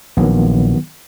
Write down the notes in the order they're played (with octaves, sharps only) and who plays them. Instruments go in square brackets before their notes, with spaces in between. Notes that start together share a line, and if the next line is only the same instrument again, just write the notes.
[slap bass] A#1 [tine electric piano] D#3 F#3 B3